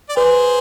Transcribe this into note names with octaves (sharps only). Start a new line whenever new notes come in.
D5
G#4 B4 C5